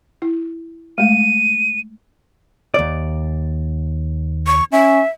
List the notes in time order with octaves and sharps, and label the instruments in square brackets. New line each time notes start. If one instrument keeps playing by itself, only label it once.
[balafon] E4
[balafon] G#3 A3 [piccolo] D#7
[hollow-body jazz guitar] D#2 D5
[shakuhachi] C#6
[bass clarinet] C#4 [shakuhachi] E5